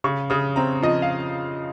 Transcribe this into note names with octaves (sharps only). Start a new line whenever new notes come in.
C#3 C#6
C#3 D#6
C4 A#5
F3 D#5
F5